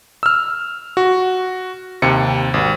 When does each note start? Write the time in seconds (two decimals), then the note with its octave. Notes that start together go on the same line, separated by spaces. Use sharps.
0.23 E6 F6
0.97 F#4
2.02 D#2 C3 C#7
2.54 G#1